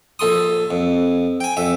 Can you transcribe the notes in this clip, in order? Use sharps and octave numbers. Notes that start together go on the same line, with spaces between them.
A#1 A4 C6 D#6
F2
G5 G#5
F2 E5